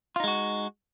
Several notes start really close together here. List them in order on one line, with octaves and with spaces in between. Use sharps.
F4 D#4 G#3 F#4